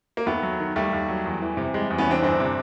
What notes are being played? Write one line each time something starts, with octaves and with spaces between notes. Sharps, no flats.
A#3
D#2 A3 B3
F#3
D#3
D#2 G3 A3
D#2
F#3
E2
E3
C3
G3 G#3
E2
B3 C#4
E3 C4 D4
G1 C4 D4
C3